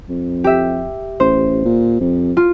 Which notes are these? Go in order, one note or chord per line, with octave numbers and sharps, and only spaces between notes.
F2
G4 E5
A1 C5
A#2
F2
F4